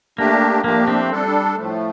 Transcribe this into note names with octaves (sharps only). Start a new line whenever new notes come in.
A3 A#3 D4 G4
F3 A3 A#3 D4 G4
C4
G3 D4 A4
A2 F3 A3